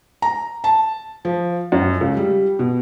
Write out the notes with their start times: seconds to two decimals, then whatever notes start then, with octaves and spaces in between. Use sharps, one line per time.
0.22 A#5
0.64 A5
1.25 F3
1.72 F#2
2.01 C#2
2.17 G3
2.59 B2